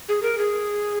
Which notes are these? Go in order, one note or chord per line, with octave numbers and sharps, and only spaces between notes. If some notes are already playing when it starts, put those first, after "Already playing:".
G#4
A#4
G#4